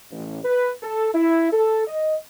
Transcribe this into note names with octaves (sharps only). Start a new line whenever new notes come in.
A1
B4
A4
E4
A4
D#5